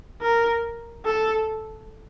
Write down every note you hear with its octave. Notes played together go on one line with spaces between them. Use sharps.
A#4
A4